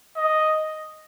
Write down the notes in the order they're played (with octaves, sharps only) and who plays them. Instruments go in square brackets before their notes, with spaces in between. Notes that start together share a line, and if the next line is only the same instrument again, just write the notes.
[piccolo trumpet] D#5